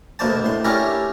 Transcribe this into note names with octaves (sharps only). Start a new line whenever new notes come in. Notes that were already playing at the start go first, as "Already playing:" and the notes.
D2 B2 A#3 C5 D5 A5
A2 C6
C#4 D4 E4 G4 A4 A#4